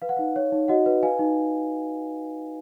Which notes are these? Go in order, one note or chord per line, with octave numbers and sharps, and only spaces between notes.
B4 F5
F#5
D#4 F5
C#5
D#4
F#4 D#5 F#5
B4
B4 F5 G#5
D#4